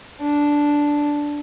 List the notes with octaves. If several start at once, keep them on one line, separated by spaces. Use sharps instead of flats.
D4